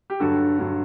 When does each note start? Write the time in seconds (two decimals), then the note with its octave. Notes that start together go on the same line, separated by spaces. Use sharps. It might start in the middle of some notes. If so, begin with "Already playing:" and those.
0.10 G4
0.20 G2 D3 F#3 F#4 A4
0.59 G2 D3 F#3